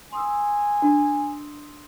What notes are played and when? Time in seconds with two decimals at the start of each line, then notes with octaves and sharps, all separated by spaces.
0.12 G#5 C6 D#6 E6
0.82 D4